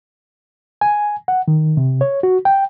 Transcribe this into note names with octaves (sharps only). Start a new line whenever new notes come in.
G#5
F#5
D#3
C3
C#5
F#4
G5